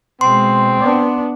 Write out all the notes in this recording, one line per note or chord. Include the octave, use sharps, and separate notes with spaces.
B2 G#3 C4 C6
B3 D4